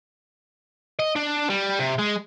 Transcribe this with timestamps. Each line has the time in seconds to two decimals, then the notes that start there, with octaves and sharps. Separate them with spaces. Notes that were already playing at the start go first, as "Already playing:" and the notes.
0.99 D#5
1.16 D4
1.49 G3
1.79 C3
1.99 G#3